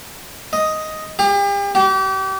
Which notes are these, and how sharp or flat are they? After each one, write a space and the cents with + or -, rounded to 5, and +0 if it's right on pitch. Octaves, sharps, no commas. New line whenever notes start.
D#5 +5
G4 +40
G4 -35